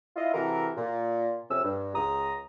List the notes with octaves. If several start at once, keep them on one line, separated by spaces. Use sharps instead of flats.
E4 F4 D#5
C3 E3 F#4 A4 A#4
A#2
F2 C3 C#4 E6
G2
C#2 A#5 D#6